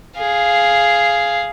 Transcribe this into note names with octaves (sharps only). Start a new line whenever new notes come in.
G#4 F5